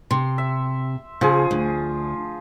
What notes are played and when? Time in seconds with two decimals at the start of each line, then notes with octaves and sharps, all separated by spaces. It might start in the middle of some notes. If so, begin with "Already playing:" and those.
0.11 C3 C6
0.38 E5
1.21 C#3 F3 G#4
1.51 D2